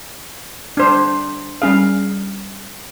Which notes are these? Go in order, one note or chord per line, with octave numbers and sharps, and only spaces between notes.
D4 C5
G3 C#4 G#4 F5